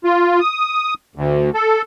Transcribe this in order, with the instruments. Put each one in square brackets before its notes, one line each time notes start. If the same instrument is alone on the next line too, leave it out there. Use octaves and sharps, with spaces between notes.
[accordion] F4
D#6
D2
A4